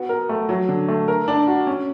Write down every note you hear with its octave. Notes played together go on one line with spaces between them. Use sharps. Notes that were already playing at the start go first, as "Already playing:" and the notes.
Already playing: B3 F#4
A#4
A3
F#3
D3
A3
A#4
D4
F#4
C#4